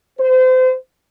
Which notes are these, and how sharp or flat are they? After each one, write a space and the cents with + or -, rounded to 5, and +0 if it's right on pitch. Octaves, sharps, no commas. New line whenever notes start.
C5 -30